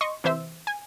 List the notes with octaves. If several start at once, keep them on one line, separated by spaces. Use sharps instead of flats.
D#5 C6 C#6
C3 E3 C5 E5 E6
G#5